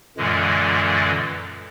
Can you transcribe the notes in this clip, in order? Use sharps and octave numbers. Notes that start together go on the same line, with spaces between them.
F#2 A#2 D3 E3 G#3